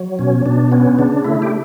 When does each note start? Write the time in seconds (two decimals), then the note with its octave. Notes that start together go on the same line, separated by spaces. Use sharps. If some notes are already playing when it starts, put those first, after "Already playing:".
Already playing: F#3
0.19 B2 C#4
0.46 B2 D4
0.72 B3 C#4
0.99 C#3 D4
1.24 A3 E4
1.42 G4